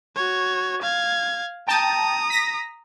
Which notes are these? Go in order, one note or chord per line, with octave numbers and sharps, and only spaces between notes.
F#4 C#5
F5 G#6
G5 A5 A#5 D#6
A#6 B6